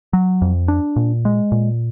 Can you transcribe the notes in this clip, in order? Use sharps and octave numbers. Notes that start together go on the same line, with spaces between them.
F#3
F2
D4
A#2
G#3
A#2